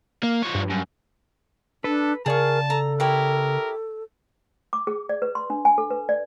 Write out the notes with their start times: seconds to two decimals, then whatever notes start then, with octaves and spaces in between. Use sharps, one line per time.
0.23 A#3
0.43 F3 C#5
0.55 G2
0.70 F#2
1.84 D4 A4 B4
2.26 C#3 G#4 A#4 D5 F5 A5 C#6
2.70 A4 A#5
3.00 E4 G4 A#4 C#5
4.73 D6
4.87 G#4
5.09 D5
5.22 B4
5.35 C6
5.50 D4
5.65 G#5
5.78 A4
5.91 B4
6.09 D5